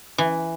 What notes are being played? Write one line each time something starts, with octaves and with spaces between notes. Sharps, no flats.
E3